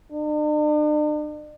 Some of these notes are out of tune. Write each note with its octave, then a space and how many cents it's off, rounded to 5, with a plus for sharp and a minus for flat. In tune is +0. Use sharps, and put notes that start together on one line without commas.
D4 +45